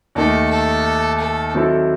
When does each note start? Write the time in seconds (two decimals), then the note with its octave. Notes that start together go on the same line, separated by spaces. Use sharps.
0.15 D#2 D#3 A3 A4
0.50 A4
1.20 A4
1.54 D#3 F#3 C4 E4 A4